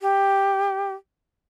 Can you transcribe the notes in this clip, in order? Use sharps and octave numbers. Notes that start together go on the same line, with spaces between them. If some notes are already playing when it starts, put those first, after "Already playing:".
G4